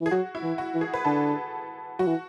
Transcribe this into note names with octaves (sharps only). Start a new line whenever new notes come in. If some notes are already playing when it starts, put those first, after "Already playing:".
E3
G#4
F#3 F#4
E4
E3
F#4
E3
G#4
B4
D3 A4
F#3 F#4
E3